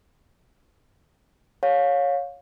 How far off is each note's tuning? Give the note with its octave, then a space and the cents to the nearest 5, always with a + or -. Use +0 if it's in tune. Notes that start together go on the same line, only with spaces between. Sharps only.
C#5 +0 F5 +25